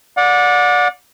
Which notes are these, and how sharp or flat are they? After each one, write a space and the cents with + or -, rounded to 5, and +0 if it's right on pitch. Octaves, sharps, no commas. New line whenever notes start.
D5 -5 F#5 -35